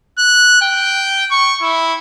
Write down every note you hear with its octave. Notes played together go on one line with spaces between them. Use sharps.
F#6
G5
C#6
E4